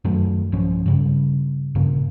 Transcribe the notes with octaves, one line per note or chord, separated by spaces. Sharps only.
F#2 D#3 F#3 A3
B1 G2 F3 C#4
G2 C#3 G3
A#1 G2 C#3 A#3